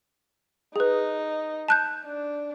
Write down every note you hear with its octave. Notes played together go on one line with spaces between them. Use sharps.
D#4 G#4 B4
A5 F#6 G6
D4